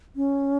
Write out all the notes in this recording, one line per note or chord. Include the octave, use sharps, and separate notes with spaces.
C#4